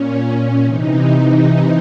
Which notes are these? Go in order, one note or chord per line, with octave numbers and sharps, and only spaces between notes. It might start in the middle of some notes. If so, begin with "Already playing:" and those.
Already playing: A#2 C#4
C#4
C3 E3 D#4